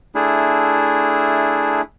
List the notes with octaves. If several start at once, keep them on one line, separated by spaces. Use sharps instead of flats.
A3 D4 E4 G#4